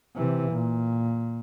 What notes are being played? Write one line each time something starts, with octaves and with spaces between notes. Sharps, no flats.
C3 E3
A#2